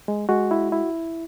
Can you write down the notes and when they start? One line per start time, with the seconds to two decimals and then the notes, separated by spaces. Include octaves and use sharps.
0.08 G#3
0.29 G#3 F#4
0.51 E4
0.72 E4